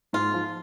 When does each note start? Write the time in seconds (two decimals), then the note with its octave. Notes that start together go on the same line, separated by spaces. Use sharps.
0.13 G#2 F4
0.34 F3